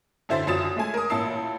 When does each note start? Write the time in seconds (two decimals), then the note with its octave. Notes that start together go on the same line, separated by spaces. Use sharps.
0.29 F#2 D3 E4 C5 E5 A6
0.47 F#1 F#2 F4 D#6 A6 E7
0.76 G#3 A3 G#5
0.94 A#4 D#6
1.10 A1 A#2 E4 A5 E6 C7